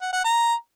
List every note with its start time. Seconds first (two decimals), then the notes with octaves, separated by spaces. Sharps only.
0.02 F#5
0.13 F#5
0.24 A#5